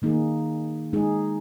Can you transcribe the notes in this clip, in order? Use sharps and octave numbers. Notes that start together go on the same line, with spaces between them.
D#3 A#3 D#4 G#4
G#3 D#4 G#4